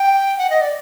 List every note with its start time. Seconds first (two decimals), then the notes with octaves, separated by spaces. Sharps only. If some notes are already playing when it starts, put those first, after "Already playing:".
Already playing: G5
0.38 F#5
0.50 D#5
0.61 D5